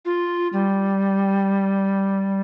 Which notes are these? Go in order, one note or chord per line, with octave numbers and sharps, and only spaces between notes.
F4
G3